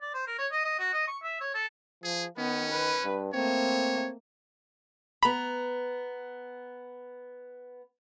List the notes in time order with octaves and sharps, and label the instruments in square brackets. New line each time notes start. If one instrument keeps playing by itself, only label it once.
[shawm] D5
C5
A#4
C#5
D#5
D#5
F#4
D#5
C#6
E5
C#5
A4
[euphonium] F3 [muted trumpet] G#4
[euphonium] D#3 [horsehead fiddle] B3 [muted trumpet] C#4
[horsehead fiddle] B4
[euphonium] G2
[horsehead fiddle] A3 A#3 [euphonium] C4 [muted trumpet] C#5
[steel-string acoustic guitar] B3 A#5 [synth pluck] B5